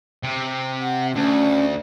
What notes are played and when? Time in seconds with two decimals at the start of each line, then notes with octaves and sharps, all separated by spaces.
0.23 C3
0.80 F#5
1.15 D2 C#4